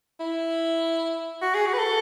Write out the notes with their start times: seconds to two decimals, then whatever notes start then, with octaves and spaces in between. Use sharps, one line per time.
0.20 E4
1.42 F#4
1.55 G#4
1.66 F#4
1.74 B4
1.79 A4